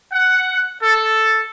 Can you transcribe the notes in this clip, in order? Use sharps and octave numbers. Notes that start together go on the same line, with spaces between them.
F#5
A4